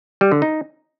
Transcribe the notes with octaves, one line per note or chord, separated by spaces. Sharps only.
G3
D3
D#4